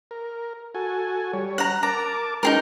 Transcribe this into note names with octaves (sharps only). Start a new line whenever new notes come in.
A#4
F#4 A4 G#5
G3 C#5
F#5 A#5
A#4 A5 A#5 D6
G#3 C#4 D#4 G#4 A#4